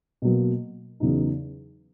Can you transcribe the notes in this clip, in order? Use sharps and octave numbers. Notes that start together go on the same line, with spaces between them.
B2 F#3 A#3
E2 C#3 F#3 B3 D#4